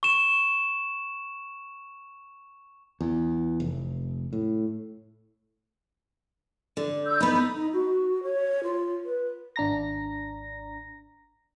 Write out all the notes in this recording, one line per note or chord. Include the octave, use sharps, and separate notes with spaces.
C#6 E7
E2
F1
A2
D3
E6 G6
B3 D#4 B5
D#4
F#4
C#5
F4
B4
G#1 D4 A#5 A#6